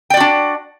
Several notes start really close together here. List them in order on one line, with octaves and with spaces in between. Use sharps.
G5 D5 F#4 D4